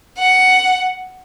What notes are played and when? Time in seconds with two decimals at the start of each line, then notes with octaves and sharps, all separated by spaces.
0.18 F#5